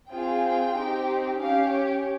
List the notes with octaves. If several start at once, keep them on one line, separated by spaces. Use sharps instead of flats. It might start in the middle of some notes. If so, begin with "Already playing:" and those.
C4 F4 G#4 G5
C4 D#4 G4
C#4 G4 F5
C#5